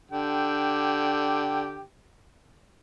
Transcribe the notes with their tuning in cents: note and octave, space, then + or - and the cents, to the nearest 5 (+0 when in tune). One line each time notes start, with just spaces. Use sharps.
D3 +0 G4 +0 G5 -10